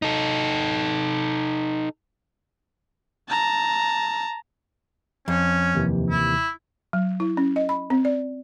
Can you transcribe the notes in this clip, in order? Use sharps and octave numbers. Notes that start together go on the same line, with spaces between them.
D#4 A4
A5 A#5
F2 C#4
D#2 C3 E3
E4
F#3
E4
C#4
D#5
B5
C4
D5